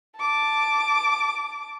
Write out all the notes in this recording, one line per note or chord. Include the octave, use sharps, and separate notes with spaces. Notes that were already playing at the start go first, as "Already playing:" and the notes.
A5 D6